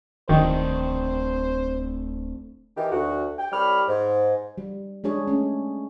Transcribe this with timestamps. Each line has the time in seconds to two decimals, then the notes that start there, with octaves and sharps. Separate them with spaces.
0.29 D1 D#3 A3 C4 D4 C5
2.76 D#3 E3 G4
2.92 D2 F#4
3.38 G5
3.51 C2 G3 C#5 B5 D6 F6
3.88 G#2
4.58 G3
5.04 G#3 D4 G#4 C#5
5.27 A3 C#4